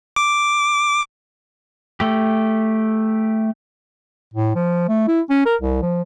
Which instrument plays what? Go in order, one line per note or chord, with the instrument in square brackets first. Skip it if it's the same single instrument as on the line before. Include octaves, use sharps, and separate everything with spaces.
[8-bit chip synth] D6
[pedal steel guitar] A3 G4
[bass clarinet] A2
F3
A3
E4
C#4
A#4
C2
F3